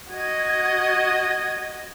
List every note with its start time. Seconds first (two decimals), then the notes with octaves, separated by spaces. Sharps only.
0.10 F#4 D#5 G#6